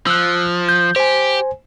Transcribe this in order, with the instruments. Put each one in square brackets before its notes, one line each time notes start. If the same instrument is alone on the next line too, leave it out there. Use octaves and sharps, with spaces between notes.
[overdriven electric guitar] F3 [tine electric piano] E6 F#6
[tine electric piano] G6
[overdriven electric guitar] G4 [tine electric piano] C5 G#5